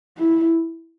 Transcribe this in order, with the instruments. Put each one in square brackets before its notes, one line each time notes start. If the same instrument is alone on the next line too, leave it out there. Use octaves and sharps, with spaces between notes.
[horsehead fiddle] E4